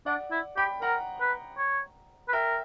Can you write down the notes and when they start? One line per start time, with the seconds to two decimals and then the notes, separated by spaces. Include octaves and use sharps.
0.06 D4 D5 F#5
0.31 E4
0.57 G4 G5 B5
0.82 A#4 F#5 A#5
1.21 B4
1.57 C#5
2.28 B4
2.33 A#4 E5 G5